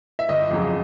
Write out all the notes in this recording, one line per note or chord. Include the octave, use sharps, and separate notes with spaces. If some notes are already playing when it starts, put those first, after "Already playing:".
E5
G1 D#5
F2 C#3 F#3